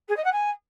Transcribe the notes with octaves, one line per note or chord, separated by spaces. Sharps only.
G#4
D#5
F#5
G#5